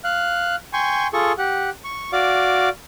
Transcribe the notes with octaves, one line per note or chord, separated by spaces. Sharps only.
F5 F#6
G5 G#5 C6 C#6
F4 G#4 A4 C#6
G4 F#5
C#6
F#4 D5 F5 D6